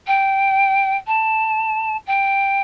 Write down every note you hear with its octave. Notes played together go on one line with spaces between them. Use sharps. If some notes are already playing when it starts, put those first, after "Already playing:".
G5
A5
G5